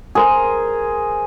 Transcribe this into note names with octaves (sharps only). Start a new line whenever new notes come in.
G#4 A#4 C5